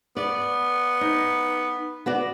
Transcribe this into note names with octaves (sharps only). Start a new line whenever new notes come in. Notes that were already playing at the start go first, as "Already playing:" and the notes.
B3 D5
D#4
B3 F#4 D5